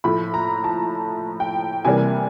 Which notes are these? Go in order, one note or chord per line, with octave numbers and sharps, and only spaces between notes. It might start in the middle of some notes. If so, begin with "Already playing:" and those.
A2 F3 A3 B5
A#5
A5
G5
C3 E3 G3 A#3 G#5